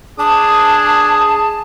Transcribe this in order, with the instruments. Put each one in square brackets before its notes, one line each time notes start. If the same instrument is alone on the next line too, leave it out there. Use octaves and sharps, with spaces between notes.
[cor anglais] D4 [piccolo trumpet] G#4 [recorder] A5 [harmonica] D#6